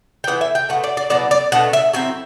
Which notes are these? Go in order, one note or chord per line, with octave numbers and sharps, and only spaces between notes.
G5
E3 B3 E4 F#5
E5
G5
B2 F#3 A3 F#5
D5
D5
B2 F#3 B3 E4 D5
D5
B2 A3 D4 F#5
E5
F#3 C4 E4 E5